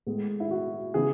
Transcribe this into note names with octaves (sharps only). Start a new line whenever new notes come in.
A2 G#3 B3
E4
F#4
C#3 E3 B3 G#4